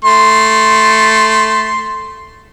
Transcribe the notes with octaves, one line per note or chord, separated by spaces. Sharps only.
A3 C6